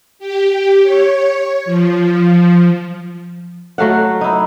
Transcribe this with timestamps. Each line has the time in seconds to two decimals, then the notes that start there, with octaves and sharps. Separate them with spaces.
0.19 G4
0.83 C#5
1.65 F3
3.78 F#3 A3 F5 F#5
4.21 D#4 E4